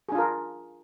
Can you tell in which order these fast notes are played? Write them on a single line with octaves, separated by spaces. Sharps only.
G#4 D4 F4 A#4